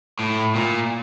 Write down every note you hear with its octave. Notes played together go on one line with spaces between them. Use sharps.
A2
A#2